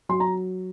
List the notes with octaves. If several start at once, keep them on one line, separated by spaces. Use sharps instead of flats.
F#3 C6
A#5